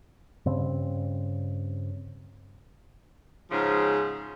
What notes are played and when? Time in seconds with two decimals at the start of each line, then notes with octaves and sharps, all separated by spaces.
0.46 G2 C#3 C4
3.51 G#2 C#3 F3